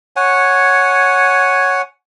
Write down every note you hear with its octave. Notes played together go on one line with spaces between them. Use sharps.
C#5 F#5 G#5